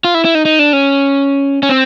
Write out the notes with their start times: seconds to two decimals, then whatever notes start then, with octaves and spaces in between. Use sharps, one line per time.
0.04 F4
0.14 E4
0.25 E4
0.35 D#4
0.45 D#4
0.59 D4
0.73 C#4
1.63 C#4
1.69 C4